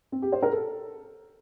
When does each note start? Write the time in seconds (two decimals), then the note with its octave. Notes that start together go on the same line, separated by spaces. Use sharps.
0.12 C4
0.22 G4
0.32 C5
0.42 A#4
0.52 A4